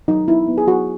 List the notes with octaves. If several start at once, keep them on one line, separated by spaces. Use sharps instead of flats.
F#3 D#4
B3 E4
B3
G#4
F#3 F#4